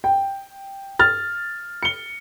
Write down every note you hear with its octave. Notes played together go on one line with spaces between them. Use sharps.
G5
F6 A6
C#7 G7